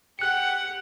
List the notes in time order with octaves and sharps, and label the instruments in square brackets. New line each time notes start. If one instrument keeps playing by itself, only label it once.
[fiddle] G4 F#5 [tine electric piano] F#6 C#7